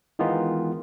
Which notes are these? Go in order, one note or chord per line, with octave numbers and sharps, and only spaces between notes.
D#3 E3 G#3 B3 D#4 F4